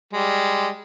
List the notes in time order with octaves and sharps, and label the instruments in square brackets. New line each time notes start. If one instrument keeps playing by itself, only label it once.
[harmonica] G3 G#3